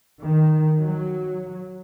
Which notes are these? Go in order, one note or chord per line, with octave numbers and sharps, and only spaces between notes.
D#3
F#3